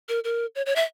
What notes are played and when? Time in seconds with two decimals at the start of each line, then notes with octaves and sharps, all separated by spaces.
0.09 A#4
0.24 A#4
0.55 C#5
0.66 C#5
0.76 E5